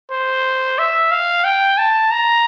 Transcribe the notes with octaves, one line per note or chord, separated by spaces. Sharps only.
C5
E5
F5
G5
A5
A#5